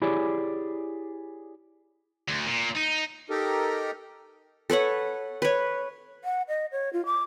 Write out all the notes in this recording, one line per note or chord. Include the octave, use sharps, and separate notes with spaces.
E4 G4 G#4 C#5 D5
D2
A#2
D#4
D#4 G4 A4 A#4
A4 B4 C#5 F#5
B4 C#5
F#5
D#5
C#5
F4
D6